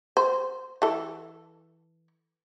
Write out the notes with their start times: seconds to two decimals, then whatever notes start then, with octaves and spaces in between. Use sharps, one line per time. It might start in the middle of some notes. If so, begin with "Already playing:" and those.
0.17 C5
0.82 E3 A4